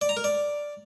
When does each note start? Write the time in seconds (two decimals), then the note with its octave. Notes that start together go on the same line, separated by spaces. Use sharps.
0.01 D5
0.09 A#5
0.17 A#4
0.24 D5